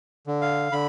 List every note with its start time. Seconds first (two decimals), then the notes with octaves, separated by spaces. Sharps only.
0.27 D3
0.42 F5
0.72 D3 B5